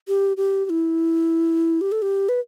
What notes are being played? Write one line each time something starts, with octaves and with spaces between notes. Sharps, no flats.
G4
G4
G4
E4
G4
A4
G4
B4